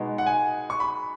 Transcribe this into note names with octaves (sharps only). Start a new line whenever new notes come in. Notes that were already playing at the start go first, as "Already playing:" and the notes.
Already playing: B2 G#3 B3 D#4
F#5
G#5
C#6
B5